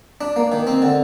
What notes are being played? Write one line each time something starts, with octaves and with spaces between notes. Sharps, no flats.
D4
A#3
D#3
C4
D3